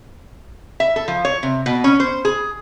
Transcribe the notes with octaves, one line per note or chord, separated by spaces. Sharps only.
E5
A4
F3
C#5
C3
B2
C#4
C5
G#4